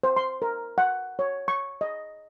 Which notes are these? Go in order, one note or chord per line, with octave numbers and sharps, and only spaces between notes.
C5
C6
A#4
F#5
C#5
C#6
D#5